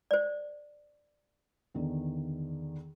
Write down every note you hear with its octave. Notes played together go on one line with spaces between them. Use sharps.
C5 D5
E2 D3 D#3